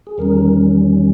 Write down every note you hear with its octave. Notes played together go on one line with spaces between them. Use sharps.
G#4
E2 D#3 G3 C#4 A#4